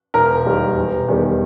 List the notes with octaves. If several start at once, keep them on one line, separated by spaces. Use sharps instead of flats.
E1 A#4
D#2 D#3 G3
E1
E2 D#3 G3